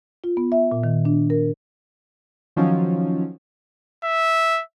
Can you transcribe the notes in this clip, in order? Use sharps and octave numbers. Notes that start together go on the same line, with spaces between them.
F4
B3
E5
A#2
D#3
D4
A#4
D#3 F3 F#3 C#4
E5